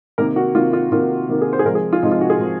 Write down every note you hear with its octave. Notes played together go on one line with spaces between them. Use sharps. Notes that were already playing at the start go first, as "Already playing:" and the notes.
C3 D#3 A#3 A#4
F#4
C3 D#3 A#3 F4
F4
C3 D#3 A#3 F4
C3 D#3 A#3
G#4
C5
G#4
C3 F3 G#3 A#4
G#4
F4
C3 F3 G#3 D#4
F4
F#4
G#4
C3 F3 G#3